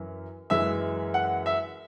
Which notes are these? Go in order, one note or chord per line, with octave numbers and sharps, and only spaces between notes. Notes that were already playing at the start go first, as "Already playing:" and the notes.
Already playing: F#2 E3
F#2 E3 G#3 E5
F#5
E5